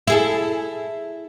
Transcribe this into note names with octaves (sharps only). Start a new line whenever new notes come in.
E4 G#4 A4